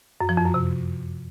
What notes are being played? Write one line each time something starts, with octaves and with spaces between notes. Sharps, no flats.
F#2
F3
F2
F#2
C3